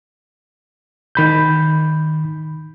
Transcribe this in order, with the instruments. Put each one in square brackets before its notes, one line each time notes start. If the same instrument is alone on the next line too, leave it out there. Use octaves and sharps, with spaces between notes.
[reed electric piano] D#3 B5 G6